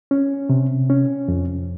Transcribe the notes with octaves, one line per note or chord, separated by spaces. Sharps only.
C#4
C3
C#4
F2